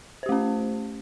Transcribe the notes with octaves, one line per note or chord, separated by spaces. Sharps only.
A3 C#4 G4 C5